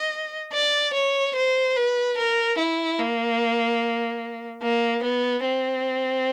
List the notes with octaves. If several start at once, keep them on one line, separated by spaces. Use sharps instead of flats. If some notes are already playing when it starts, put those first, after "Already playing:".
Already playing: D#5
D5
C#5
C5
B4
A#4
E4
A#3
A#3
B3
C4